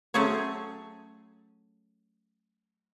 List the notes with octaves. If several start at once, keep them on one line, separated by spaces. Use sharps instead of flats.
F#3 A3 C#4 G#4 C5 C#5